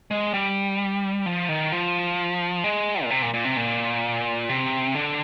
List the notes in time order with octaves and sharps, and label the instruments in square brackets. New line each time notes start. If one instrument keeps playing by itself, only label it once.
[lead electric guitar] G#3
G3
F3
D#3
F3
G#3
A#2
C3
A#2
A#2
C3
A#2
C3
D3